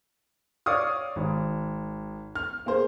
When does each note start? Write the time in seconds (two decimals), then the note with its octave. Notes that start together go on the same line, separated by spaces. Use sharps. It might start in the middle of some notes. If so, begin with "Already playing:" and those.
0.66 C#5 D5 F5 C#6 D#6 F6
1.16 G#1
2.35 F6
2.66 A#3 G#4 C5